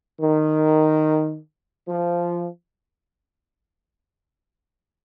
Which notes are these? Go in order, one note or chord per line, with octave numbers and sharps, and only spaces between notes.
D#3
F3